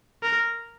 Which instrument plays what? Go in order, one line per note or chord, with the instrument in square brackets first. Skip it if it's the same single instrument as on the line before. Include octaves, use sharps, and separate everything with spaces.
[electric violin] A#4